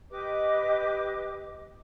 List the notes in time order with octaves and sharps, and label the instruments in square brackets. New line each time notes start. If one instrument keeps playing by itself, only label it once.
[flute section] G4 B4 D#5 D6